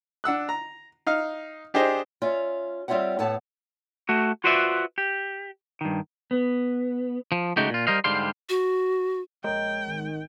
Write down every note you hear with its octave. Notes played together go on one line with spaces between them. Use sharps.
D4 F#5 E6 F#6
A#5
D#4 F5 F6
D4 G4 G#4 C5 D#5
C#4 F4 C#5 D5 E5
G3 C4 F4 C#5 E5 F#5
A2 B3 A4 C#5 F#5 A5
A3 F#4
F4 F#4 B4 C5 D5 E5
G4
G2 D#3
B3
F3
C#3 G#3 A3 D#4 F#4 G4
A#2 F4
G3 A#4 C5 D#5 F5
G#2 D3 G3 G4 F5 C6
F#4
A#1 G#3 A#4 C#5 D#5 G5
G#1 D#3